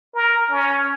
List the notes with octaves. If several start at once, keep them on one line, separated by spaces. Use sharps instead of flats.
A#4
C#4